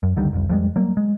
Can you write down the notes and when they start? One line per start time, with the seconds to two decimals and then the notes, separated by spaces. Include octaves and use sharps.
0.03 F#2
0.16 C#2 D3 D#3 G3
0.33 F1 C2
0.49 F2 G3 G#3
0.76 F#3 G3 A#3
0.97 G#3